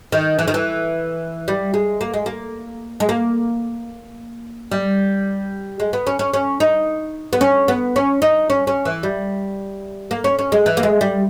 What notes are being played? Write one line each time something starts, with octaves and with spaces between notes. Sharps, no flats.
D#3
E3
D#3
E3
G3
G#3
A#3
G#3
A#3
G#3
A#3
G3
G#3
B3
C#4
C#4
C#4
D#4
B3
C#4
B3
C#4
D#4
C#4
C#4
E3
G3
A#3
C#4
C#4
G#3
E3
A#3
G#3
G3